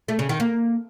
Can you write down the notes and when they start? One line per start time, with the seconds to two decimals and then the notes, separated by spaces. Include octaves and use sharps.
0.08 A3
0.19 C#3
0.29 D#3
0.40 A#3